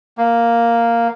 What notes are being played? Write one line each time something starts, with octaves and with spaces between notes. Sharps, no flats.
A#3